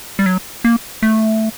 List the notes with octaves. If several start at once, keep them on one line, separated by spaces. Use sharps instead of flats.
G3
F#3
A#3
A3